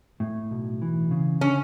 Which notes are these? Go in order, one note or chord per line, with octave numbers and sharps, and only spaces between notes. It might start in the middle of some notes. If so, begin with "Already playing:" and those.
A2
B1
E3
C#3
D3 C#4